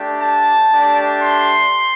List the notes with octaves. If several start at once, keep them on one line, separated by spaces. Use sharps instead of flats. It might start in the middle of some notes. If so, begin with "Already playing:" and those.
Already playing: A3 D4 G4
A5
A3 D4 G4
C6